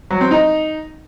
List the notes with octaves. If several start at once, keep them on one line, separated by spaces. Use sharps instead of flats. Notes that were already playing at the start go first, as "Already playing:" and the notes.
F#3
C4
D#4